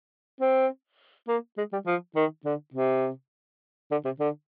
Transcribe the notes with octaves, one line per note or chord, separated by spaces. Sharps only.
C4
A#3
G#3
G3
F3
D#3
D3
C3
D3
C3
D3